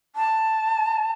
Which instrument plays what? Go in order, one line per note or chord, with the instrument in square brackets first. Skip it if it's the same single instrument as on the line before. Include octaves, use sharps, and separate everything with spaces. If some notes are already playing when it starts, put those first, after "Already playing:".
[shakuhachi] A5